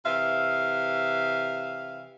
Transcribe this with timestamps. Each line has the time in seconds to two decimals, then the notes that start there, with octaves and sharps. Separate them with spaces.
0.06 C3 E3 E5 F5